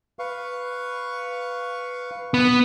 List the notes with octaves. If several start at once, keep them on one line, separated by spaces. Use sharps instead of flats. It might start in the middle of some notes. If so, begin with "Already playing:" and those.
B4 F5 C#6
B3